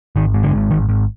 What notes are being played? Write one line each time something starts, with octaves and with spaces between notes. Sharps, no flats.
G#1 D#3
G#2
D3
G#1
G#1 D#3
G#1